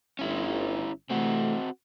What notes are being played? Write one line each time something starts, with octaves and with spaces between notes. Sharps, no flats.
G1 C#4 E4
C3 E3 A3 C4 F#4